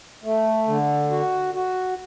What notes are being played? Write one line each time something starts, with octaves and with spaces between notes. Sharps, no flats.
A3
D3
F#4
F#4